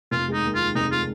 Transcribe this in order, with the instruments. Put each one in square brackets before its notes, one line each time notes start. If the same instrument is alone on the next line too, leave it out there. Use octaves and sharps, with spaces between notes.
[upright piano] F1 [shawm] F4
[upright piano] G#3 [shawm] D#4
[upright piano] D#2
[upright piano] D#3 [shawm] F4
[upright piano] F1 [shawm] D#4
[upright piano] G#3 [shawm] F4